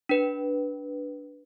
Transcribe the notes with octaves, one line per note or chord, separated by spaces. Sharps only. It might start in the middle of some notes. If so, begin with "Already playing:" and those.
D4 B4